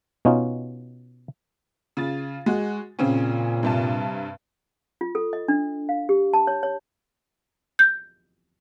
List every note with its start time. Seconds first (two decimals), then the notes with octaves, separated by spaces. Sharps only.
0.25 B2 C#4 D#4 F4
1.97 C#3 F4 A6
2.46 G#3 F#4
2.99 A#2 C#3 C4 C#4
3.63 G2 C3 A5
5.01 F4
5.15 A4
5.33 D#5
5.48 D4
5.89 F5
6.09 G4
6.33 A5
6.47 C#5
6.63 C#5
7.79 G6